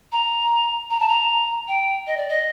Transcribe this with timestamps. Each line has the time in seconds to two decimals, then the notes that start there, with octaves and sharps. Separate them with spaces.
0.12 A#5
0.90 A#5
1.00 A5
1.08 A#5
1.68 G5
2.07 D#5
2.17 D5
2.28 D#5